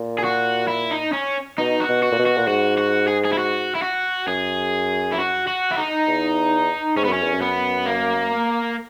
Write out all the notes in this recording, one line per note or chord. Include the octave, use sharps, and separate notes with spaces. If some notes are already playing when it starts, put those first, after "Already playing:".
Already playing: A#2
G#4
F#4
E4
D#4
C#4
B2 D#4
F#4
B2
F#4
A#2
B2
F#4
A#2
G#2 F#4
F#4
G#4
G#4
E4
F#4
E4
F#4
F#2 G#4
E4
F#4
F#4
E4
D#4
E2
G#2 C#4
B3
F#2 C#4
E2
F#2
B3
A#3